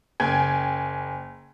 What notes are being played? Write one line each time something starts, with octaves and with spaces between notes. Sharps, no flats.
F#1 G5 G#5 G#6